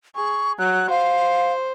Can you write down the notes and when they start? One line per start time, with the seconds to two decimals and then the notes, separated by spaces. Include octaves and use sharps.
0.16 G#4 C#6
0.59 F#3 F#6
0.90 C5 F5